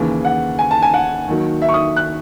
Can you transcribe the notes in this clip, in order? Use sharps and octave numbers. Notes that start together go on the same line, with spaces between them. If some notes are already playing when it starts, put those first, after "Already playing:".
Already playing: D#2 C#3 E3
F#5
G#5
A5
G#5
F#5
D#2 D#3 F#3
E5
C#6
D#6
F#6